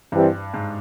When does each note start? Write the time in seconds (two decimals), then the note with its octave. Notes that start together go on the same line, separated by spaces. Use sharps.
0.12 G2 E3 G3 C4
0.54 G#2